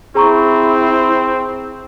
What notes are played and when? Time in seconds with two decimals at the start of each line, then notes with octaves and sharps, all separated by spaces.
0.15 C4 E4 G#4 A#5 C#6